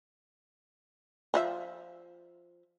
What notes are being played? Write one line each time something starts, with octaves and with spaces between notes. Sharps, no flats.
F3 F4 E5